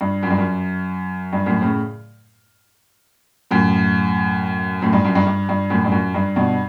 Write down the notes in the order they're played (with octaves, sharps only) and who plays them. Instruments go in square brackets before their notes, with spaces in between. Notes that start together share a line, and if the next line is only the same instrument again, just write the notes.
[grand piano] G2
F#2
G2
F#2
G2
F#2 A2
A2 C#3
F#2 A2
F#2 A2
G2
F#2
G2
G2
G2
F#2 A2
G2
F#2
G2
G2 B2